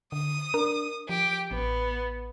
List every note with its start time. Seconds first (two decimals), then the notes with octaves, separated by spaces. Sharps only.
0.12 D3 D#6
0.54 D4 A#4
1.09 F3 G4 D7
1.51 A1 B3